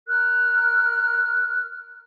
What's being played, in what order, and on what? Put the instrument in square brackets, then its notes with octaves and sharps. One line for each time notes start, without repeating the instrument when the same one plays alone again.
[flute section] A#4 F6 F#6